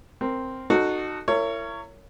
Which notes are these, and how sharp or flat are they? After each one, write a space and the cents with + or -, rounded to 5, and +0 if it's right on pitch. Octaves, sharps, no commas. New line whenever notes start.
C4 +0 A#4 -5
D#4 -25 F#4 +0 A4 +0
E4 +30 A#4 -30 C#5 +10